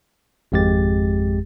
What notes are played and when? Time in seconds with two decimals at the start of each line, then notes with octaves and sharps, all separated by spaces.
0.52 G#1 F2 G#3 G4 A6